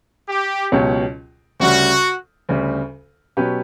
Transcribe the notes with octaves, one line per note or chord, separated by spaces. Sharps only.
G4
C#2 B2 F#3 C#4 G4
D2 C#3 G3 F#4
D2 C#3 G3
B2 F#3 C#4 G4 B4